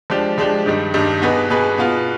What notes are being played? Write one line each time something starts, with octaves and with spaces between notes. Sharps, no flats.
F3 G#3 D4 G4
F3 G#3 D4 G4
G2 D#3 G3
G2 D#3 G3
B2 B3 D#4 G#4 B4
B2 B3 D#4 G#4 B4
B2 B3 F4